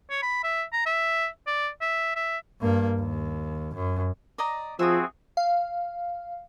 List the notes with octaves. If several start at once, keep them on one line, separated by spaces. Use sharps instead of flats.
C#5
B5
E5
A#5
E5
D5
E5
E5
G2 A#3
D#2
F#2
D5 D#5 A#5
F3 C4 F#4 G#4 E5 D#6
F5